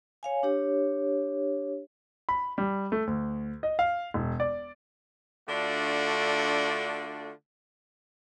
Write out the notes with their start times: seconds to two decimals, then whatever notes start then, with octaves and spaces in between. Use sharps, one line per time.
0.23 C#5 F5 G#5
0.43 D4 G4 C#5
2.29 B5
2.58 G3
2.92 A3
3.07 D2
3.63 D#5
3.79 F5
4.14 E1
4.40 D5
5.49 D3 A3 D4 F4 F#4